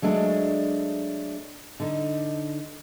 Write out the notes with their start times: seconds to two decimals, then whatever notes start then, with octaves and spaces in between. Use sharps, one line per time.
0.02 F#3 G#3 A3 D4
1.80 D3 D#4